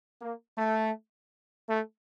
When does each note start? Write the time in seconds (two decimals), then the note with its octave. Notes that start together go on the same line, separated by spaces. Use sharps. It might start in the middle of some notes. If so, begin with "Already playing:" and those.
0.21 A#3
0.58 A3
1.69 A3